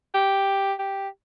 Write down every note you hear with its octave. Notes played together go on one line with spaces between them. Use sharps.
G4
G4